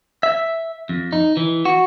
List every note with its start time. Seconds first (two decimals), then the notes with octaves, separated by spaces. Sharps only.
0.23 E5
0.89 F2
1.13 D#4
1.37 E3
1.65 F#4